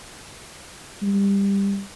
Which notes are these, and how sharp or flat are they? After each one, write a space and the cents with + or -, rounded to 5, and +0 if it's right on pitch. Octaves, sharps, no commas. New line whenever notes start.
G3 +20